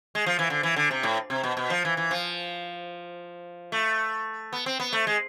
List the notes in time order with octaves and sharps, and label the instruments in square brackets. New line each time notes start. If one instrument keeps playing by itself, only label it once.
[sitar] G#3
F3
E3
D3
E3
D3
C3
A2
C3
B2
B2
F3
E3
E3
F3
A3
B3
C4
B3
A3
G#3